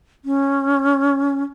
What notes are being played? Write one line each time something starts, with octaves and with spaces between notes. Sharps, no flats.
C#4